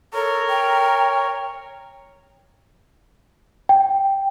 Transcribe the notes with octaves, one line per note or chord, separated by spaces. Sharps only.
A4 A#4 C#5
G5
G5